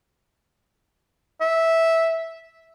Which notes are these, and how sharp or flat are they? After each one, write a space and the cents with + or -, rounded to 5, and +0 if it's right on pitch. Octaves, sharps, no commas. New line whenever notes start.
E5 -10